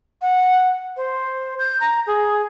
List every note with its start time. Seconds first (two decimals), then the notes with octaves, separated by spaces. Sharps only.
0.21 F#5
0.96 C5
1.58 G6
1.80 A#5
2.06 G#4